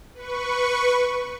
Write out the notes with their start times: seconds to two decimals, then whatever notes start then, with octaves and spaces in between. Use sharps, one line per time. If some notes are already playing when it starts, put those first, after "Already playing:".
0.15 B4 C#6